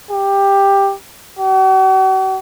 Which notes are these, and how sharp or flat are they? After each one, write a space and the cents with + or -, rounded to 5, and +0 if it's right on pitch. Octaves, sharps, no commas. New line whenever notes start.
G4 +10
F#4 +45